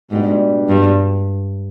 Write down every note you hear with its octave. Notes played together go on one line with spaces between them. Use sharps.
G#2 B2 G3 D4
G2